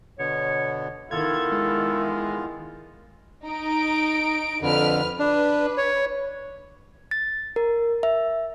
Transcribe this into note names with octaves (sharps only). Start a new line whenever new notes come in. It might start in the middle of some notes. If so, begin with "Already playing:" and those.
B2 D3 B3 C#5
D#3 B3 E4 F4 A4 F5 G#6
G#3
D#4 D7
F2 D3 B4 F6
D4 B4
C#5
A6
A#4
E5